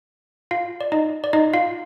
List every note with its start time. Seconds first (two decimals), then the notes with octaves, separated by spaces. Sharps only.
0.51 F4 F5
0.81 D5
0.92 D#4 D#5
1.24 D5
1.33 D#4 D#5
1.54 F4 F5